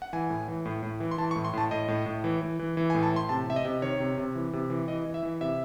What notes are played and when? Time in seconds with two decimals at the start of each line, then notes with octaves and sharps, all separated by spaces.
0.02 F#5
0.13 E3 G#5
0.30 A2
0.48 E3
0.65 A2
0.83 A2
1.00 E3
1.11 C6
1.18 E3 A5
1.31 C#6
1.36 A2
1.45 C6
1.53 A2 A5
1.71 A2 D#5
1.88 A2
2.06 A2
2.24 E3
2.42 E3
2.59 E3
2.77 E3
2.90 G#5
2.94 A2
3.03 A5
3.12 A2 C6
3.29 C3 A5
3.47 C3 E5
3.56 D#5
3.65 C3
3.82 D#3 C#5
4.00 C3
4.17 C3
4.35 E3
4.53 C3
4.70 E3
4.88 E3 D#5
5.06 E3
5.14 E5
5.23 E3
5.41 C3 E5